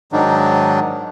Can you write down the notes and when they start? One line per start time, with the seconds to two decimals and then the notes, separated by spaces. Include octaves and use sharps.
0.13 G#2 D#3 F#3 D4 D#4